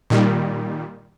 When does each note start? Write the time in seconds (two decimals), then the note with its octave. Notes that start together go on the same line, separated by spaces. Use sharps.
0.10 A#2 D#3 G3